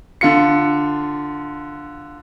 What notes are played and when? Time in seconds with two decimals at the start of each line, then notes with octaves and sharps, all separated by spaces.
0.21 D3 F4 C#7